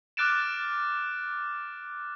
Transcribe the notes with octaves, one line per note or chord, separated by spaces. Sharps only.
D6 F6 F#6 A6 D7 E7